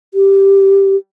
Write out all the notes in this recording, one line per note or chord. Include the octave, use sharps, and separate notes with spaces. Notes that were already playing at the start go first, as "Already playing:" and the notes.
G4